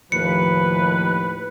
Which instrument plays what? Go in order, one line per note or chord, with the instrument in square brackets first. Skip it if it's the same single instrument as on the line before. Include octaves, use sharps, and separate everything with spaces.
[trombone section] D#2 A2 [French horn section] F3 [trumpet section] B4 [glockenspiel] C#7